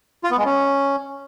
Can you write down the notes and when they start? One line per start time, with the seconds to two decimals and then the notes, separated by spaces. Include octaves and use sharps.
0.24 F4
0.31 B3
0.38 G#3
0.45 C#4